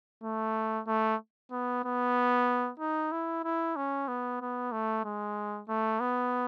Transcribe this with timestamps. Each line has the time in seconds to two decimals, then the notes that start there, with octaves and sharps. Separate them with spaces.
0.24 A3
0.87 A3
1.51 B3
1.84 B3
2.80 D#4
3.12 E4
3.44 E4
3.76 C#4
4.08 B3
4.41 B3
4.72 A3
5.05 G#3
5.68 A3
6.00 B3